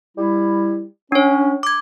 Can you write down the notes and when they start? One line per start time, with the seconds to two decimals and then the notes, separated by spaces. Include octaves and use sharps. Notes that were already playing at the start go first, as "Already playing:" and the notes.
0.17 G3 E4
1.12 C#4 D4 C#5
1.63 D6 G#6